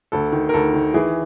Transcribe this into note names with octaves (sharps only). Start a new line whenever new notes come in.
D2 A4
D#3
A#4
D2 A4
D#3
E3 G#4